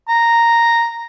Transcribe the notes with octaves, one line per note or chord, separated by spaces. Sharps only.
A#5